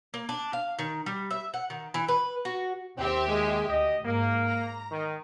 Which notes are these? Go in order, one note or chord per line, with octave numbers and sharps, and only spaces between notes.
A#3
D4
F5
D#3
G3
E5
F#5
D#3
E3
B4
F#4
D#2 C4 G4 E5
G#3
D2 G4 D#5
G#2 A#3
A#5
D#3